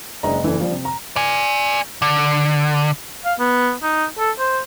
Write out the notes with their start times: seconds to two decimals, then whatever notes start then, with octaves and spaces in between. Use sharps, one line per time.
0.23 F#1 G#3 D4 D#5 A#5
0.43 F#1 E3 D4 A4
0.60 F3 G3
0.72 C3
0.85 A#5
1.16 D5 G#5
2.02 D3
3.25 F5
3.39 B3
3.83 D#4
4.19 A4
4.39 C5